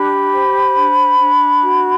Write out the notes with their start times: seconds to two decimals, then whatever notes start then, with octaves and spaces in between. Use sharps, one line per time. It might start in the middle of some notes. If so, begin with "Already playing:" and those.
Already playing: D4 G4 B5
0.31 C5
0.76 D4
1.18 D4
1.63 F#4